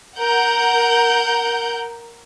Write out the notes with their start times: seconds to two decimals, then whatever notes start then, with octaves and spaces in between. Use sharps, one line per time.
0.17 A#4 F#5 G6